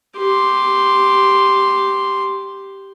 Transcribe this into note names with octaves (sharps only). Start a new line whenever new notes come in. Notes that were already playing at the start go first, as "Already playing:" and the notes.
G4 C6